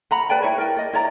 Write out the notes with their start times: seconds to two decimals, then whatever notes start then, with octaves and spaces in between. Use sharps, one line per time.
0.11 F#5 A#5 B5
0.29 B4 D5 G5 A5
0.42 E4 B4 C#5
0.58 A#4 D5 G5
0.77 D5 D#5
0.93 E4 C#5 D5 A#5